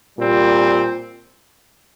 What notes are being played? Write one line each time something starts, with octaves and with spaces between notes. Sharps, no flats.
A#2 G3 C4